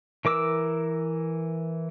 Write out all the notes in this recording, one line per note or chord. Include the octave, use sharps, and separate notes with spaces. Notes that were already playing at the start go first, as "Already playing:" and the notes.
E3 A#4 D6 E6